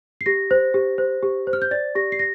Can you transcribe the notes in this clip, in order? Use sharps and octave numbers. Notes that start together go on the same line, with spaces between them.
C7
G4 A#6
C5
G4
C5
G4
C5
F6
G6
D5 A6
G4 A#6
C7
A#6